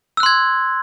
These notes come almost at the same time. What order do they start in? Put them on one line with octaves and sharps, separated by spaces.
E6 F#6 C6 G#6